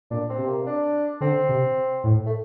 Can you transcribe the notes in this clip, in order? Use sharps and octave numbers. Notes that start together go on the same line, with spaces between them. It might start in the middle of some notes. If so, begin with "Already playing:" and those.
A#2 D4
C4
C3
A#3
D4
D3 C4
C3
A2
A3